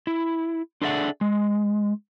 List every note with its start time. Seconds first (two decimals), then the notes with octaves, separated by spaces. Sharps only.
0.07 E4
0.82 D4 G#4 A4 D5 E5 F#5
1.21 G#3